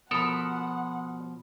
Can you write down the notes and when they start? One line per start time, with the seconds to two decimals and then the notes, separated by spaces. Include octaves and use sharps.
0.11 B2 F3 A4 A#4 F#5 B5 D#6